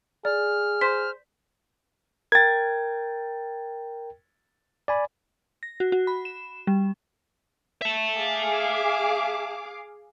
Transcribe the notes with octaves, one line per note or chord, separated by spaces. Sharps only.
G#4 D5 F6
C5 B6
A#4 G5 G#6 A6
D5 G#5 B5
A#6
F#4
F#4
B5
E7
G3
E5 A5
G#4 F5 D6